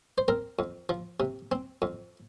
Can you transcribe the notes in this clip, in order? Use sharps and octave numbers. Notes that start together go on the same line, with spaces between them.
C5
C4 A#4
F2
F3
C3
C4
F2